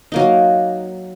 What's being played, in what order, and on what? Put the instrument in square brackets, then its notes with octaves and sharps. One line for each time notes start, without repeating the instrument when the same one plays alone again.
[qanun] F#3 A#3 D#4